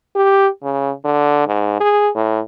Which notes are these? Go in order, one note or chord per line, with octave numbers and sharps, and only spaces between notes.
G4
C#3
D3
G#2
G#4
A2